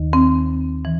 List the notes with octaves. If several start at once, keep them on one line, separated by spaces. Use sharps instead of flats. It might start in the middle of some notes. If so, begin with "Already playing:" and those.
Already playing: D#2 D#3
C4
E3